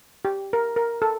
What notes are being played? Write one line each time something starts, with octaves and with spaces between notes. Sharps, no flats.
G4
A#4
A#4
A4